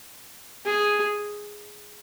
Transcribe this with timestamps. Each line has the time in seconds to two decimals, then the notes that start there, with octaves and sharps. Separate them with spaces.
0.65 G#4